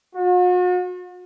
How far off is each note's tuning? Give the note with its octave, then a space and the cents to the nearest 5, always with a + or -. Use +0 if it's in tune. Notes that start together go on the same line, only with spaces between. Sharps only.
F#4 -45